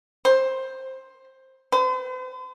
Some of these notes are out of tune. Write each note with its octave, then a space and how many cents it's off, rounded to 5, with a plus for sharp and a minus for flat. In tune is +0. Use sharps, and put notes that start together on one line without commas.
C5 +10
C5 -45